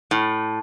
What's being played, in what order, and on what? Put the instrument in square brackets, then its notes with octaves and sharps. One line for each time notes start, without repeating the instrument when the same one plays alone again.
[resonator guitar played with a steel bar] A2